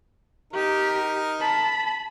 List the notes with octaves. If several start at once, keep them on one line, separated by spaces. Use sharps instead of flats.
D#4 G4 A#4
A5 B5